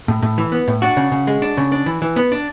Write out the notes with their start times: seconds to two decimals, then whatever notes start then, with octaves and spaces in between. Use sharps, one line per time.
0.08 A2
0.22 A2
0.38 E3
0.52 B3
0.68 A2
0.82 D4 F#4
0.97 C#3
1.12 C#3
1.27 G#3
1.42 D4
1.57 C#3
1.72 D4
1.86 E3
2.02 E3
2.16 B3
2.32 D4